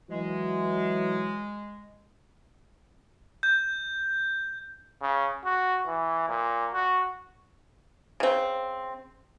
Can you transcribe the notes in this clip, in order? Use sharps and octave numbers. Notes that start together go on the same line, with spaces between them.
E3 F#3 G#3
G6
C#3
F#4
E3
A#2
F#4
C#3 C4